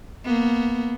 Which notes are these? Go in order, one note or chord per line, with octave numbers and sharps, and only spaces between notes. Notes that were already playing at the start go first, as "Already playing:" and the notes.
A#3 B3